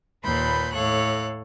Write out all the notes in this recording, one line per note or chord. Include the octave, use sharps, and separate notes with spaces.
D#2 A#2 B4 B5 C6 G6
A2 A4 C#5 F5 F#6